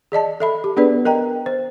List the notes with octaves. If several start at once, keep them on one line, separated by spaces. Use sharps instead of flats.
G#4 D5 D#5 A5
A4 E5 B5
G4
B3 D4 G#4 B4 D5
A#4 D#5 G5 A#5
C5